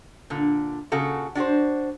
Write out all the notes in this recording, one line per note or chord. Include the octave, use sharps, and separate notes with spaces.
A#2 D3
A#2 C#3 F#4 A4
D4 F#4 G#4 C5